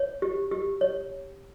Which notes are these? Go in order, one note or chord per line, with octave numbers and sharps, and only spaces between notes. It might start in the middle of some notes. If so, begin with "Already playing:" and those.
Already playing: C#5
G4
G4
C#5